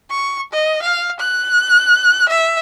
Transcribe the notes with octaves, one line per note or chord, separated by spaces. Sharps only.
C#6
D#5
F5
F#6
E5